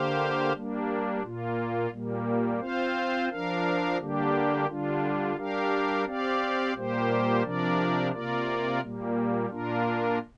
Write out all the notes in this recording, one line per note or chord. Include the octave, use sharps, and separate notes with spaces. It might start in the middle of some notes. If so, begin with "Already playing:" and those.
Already playing: D3 A#3 G4 C5 F5
G3 A#3 D4
A#2 A#3 F4
A#2 G3 A#3
C4 F4 C5 F5
F3 D4 A#4 F5
D3 G3 A#3 D4 G4
D3 G3 D4 F4
G3 D4 G4 A#4 F5
C4 G4 D5 F5
A#2 G3 A#3 G4 C5
C3 F3 D4 A#4 D5
C3 A#3 F4 A#4 D5
A#2 G3 A#3
A#2 A#3 D4 F4 A#4